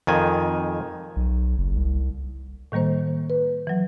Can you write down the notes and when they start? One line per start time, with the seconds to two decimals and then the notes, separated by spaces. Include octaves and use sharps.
0.07 F2 D#3 G#5
1.16 B1
1.58 F#1
1.75 C2
2.72 A2 D#3 G3 A#3 C5
3.30 B4
3.67 E3 F#3